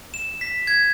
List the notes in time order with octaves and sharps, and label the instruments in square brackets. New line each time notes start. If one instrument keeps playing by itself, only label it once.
[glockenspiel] E7
B6
G#6